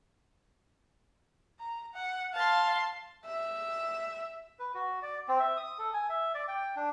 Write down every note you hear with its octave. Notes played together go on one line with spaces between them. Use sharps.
A#5
F#5
F5 A5 C6
E5
B4
F#4
D5
C4
E5
D#6
A4
G#5
E5
D5
G5
D4